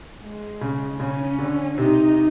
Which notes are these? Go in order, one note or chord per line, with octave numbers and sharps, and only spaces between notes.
G#3
C#3
C#3 C#4
D3
C3 D#4